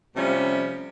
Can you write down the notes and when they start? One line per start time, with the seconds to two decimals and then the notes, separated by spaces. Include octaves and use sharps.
0.16 C3 F3 G3 A3 C#4